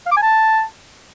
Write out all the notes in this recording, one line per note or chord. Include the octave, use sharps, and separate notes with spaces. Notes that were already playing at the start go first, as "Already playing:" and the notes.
F5
D6
G#5
A5